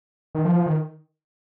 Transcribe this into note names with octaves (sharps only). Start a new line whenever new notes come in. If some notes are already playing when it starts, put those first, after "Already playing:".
D#3
F3
F3
D#3